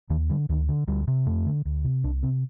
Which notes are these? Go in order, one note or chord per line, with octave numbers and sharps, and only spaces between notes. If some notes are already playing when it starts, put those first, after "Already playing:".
D#2 D#3
D3 G3
D2 D#3
D3
D2 G3
C3
F2 A3
D3
D2
C3
C2 D4
C3 C4